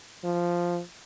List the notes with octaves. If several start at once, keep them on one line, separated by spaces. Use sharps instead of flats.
F3